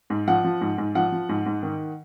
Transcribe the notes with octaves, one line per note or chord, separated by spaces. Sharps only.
G#2
F3 F#5
F3
G#2
G#2
F3 F#5
F3
G#2
G#2
D#3